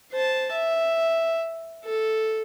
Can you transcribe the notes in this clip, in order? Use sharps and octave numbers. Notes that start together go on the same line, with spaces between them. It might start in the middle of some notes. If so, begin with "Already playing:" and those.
C5 A5
E5
A4